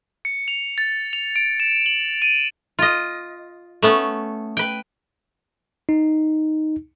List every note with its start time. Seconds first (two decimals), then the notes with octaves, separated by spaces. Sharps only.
0.25 C#7
0.48 F7
0.78 A6
1.13 F7
1.36 D7
1.60 E7
1.86 F#7
2.22 D#7
2.79 F4 D#5
3.83 A3 B3 C#4
4.57 B4 G5
5.89 D#4